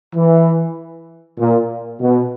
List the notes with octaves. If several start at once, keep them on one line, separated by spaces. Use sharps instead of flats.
E3
A#2
B2